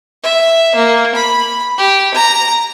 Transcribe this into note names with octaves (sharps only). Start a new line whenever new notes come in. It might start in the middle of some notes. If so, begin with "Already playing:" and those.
E5
A#3
B5
G4
A#5